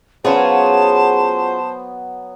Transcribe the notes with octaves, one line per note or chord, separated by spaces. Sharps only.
F#3 B3 C#4 F4 G#4 C5 A5